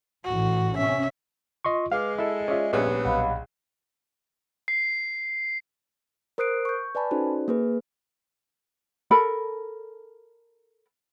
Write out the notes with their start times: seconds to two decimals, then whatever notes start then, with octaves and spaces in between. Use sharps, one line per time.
0.24 A1 A2 F#4
0.77 C3 C#4 E5
1.65 F4 D#5 C6 C#6
1.92 G#3 B4 F5 D6 F6
2.18 E4 A4 D#5 E5
2.48 C#4 F4 G#4 D5 E5
2.73 A#1 G3 B3 C#4
3.05 B1 D#5 F5 F#5 B5
4.68 C7
6.38 A#4 C5 D#6 F#6 C7 D7
6.65 C#6 G6
6.95 B4 D5 G#5 A5 B5
7.11 C#4 D#4 F#4 A4 C5 D5
7.48 A#3 G#4 B4
9.11 A4 A#4 B5